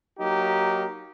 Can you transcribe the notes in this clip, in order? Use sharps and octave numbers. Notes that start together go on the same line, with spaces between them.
F#3 A#3 D#4 G4